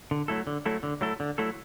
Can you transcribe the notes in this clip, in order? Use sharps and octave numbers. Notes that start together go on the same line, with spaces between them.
D3
F#3 A3 E4 A4
D3
F#3 A3 E4 A4
D3
F#3 A3 E4 A4
D3
F#3 A3 E4 A4